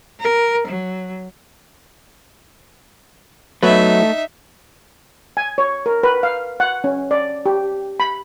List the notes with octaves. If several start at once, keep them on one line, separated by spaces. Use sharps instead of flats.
A#4
F#3
F#3 A3 B3 D#4 B4 E5
G#5
C#5
A#4
B4
F5
F#5
C#4
D5
G4
B5